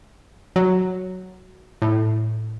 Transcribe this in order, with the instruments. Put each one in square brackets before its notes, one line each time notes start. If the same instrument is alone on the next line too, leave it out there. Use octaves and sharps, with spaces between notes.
[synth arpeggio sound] F#3
A2